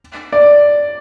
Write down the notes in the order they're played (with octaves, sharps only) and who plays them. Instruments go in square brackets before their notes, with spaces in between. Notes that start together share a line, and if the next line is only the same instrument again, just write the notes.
[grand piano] D5